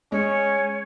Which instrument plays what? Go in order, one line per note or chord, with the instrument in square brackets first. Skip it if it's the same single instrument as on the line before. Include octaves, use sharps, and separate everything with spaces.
[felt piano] G#3 [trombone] C#4 [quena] C#5